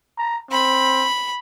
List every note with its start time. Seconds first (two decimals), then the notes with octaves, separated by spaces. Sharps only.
0.18 A#5
0.51 C4 B5